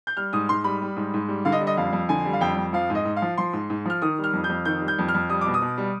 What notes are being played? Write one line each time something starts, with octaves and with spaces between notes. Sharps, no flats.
G6
G3 F6
G#2 D#6
G#2 C6
G3 B5
G3
G#2
G#2
G3
D3 F5
D#5
G3
D#5
F2 F5
F2
D3 G#5
G3
F5
F2 G5
F2
F3 F5
G#2
D#5
G#2
F5
F3
F3 C6
G#2
G#2
F3 F6
D#3 D#6
G3
F6
F2
G6
F2
D#3 G6
G3
G6
F2
F6
F2
G3 D#6
B2 D6
D#6
B2
G3